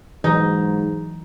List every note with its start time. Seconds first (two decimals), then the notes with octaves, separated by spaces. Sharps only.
0.24 G#2 E3 F#3 G#3 D#4